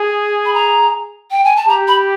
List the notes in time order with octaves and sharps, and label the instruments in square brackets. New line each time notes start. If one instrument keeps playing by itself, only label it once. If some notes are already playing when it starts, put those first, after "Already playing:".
Already playing: [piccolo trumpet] G#4
[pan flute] B5
A#5
G5
G#5
A5
[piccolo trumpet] G4 [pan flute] A#5
[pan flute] B5